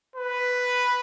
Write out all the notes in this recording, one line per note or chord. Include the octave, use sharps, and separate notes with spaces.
B4